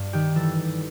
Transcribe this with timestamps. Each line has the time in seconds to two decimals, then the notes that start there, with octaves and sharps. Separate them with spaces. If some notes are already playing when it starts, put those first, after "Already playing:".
Already playing: G2
0.13 D#3 G4
0.35 E3 A4